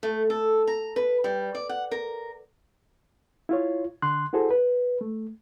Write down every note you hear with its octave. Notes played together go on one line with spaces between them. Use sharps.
A3
A4
A#5
B4
G3
D5
F#5
A#4
E4 F4 C#5
D3 C6 F#6
E4 F#4 G#4 A4 C5
B4
A3